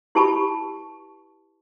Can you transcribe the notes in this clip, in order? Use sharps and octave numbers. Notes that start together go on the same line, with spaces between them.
E4 G4 B4 A5 B5 C#6